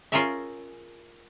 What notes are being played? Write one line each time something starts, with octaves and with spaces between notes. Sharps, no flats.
C#4 F4 G#4 A#4 C#5 E5